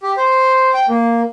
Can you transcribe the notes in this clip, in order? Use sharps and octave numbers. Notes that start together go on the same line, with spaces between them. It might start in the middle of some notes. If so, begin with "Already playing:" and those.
G4
C5
G5
A#3